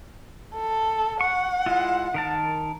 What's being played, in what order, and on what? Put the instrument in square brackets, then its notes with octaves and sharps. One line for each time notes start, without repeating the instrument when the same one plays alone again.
[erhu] A4
[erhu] F#5 [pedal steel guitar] C#6
[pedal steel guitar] G#3 E4 F4
D#3 A#4 A5